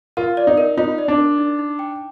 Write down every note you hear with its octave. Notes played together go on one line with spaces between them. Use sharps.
F4 A#4
D5
D#4
A#4
D#4 F4
D5
D4
A#4
D#4
D#4
G5